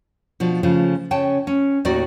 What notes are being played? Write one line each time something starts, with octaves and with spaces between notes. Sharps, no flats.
B2 F3 D4
C#3 F3 A3
C#3 C#4 G5 A5
C#4
D#2 A2 D#3 F#4 D5